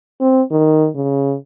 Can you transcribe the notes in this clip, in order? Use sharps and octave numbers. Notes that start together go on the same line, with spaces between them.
C4
D#3
C#3